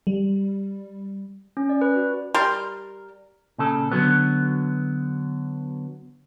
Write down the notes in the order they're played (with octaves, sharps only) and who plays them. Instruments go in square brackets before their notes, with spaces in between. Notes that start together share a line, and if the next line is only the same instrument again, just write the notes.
[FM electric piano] G3
[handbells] C#4
D5
B4
F#4
[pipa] G3 A#4 C6
[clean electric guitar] A#2 C#3 A4
D3 F#3 B3